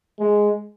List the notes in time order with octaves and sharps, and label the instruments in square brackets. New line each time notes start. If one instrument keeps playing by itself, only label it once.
[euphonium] G#3